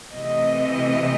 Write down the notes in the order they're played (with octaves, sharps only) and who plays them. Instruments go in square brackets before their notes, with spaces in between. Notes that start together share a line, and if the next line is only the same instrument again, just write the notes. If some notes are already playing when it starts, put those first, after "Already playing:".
[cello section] C3 E3 A3 D#5